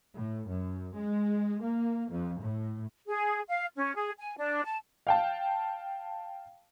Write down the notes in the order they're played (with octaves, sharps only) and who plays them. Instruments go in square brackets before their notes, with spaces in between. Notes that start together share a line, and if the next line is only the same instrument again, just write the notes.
[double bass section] A2
F#2
G#3
A#3
F2
A2
[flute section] G#4
F5
C#4
G#4
G#5
D4
A5
[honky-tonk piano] F5 G5 A5